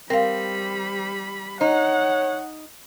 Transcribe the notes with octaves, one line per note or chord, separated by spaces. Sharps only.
G3 C4 A#4 F5 B5
D#4 C#5 F#5